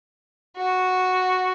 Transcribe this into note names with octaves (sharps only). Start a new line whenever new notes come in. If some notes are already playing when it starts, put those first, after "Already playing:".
F#4